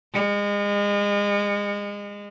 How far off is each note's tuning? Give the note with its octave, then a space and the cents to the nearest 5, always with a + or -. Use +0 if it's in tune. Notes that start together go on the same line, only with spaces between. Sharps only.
G#3 -30